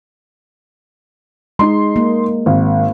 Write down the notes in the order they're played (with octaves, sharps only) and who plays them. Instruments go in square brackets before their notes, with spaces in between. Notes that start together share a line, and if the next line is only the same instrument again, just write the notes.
[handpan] G#3 [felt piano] D#4 C6
[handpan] A#3
[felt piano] G#1